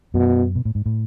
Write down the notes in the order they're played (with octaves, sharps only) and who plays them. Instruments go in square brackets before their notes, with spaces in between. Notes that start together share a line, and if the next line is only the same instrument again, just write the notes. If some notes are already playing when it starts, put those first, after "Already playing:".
[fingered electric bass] F#2 [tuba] B2
[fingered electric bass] B2
A2
G#2
A2